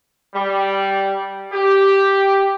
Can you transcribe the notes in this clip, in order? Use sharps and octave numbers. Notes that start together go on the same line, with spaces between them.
G3
G4